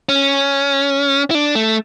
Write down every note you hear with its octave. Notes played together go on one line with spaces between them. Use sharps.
C#4
E4
D4
A3